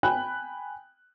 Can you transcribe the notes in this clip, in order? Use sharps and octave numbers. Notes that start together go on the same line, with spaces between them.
G5 G#5 B5 F#6